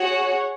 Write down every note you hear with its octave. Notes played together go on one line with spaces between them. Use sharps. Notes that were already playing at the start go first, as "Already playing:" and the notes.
Already playing: F#4 G#4 C#5 F#5